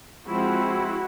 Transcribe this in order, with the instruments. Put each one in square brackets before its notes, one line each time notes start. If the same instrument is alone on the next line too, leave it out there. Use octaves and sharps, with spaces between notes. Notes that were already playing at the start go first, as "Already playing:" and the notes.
[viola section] F3 G#3 C4 E4 F#4